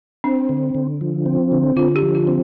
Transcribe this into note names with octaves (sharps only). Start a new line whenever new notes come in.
C4 D4
D3
D3
F3
C4
D3
D3 F4
G4
F3
F4
C4